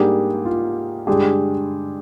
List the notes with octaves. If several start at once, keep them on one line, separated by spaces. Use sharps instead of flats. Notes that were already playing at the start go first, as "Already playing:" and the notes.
Already playing: G#2 G3 A#3 D4 G4 G#4
F4
G2 D3 G#3 D4 G4 G#4